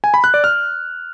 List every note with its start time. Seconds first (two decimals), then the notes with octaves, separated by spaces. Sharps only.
0.04 G#5
0.14 B5
0.24 F#6
0.34 D5
0.44 F6